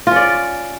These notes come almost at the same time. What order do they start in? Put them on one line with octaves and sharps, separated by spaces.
F4 C#4 D5